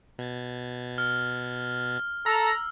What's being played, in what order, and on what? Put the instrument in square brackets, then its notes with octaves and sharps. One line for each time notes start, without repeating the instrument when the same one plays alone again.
[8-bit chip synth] B2 G#6 A6
[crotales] F6
[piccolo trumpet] A4 [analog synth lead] A#5 [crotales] E6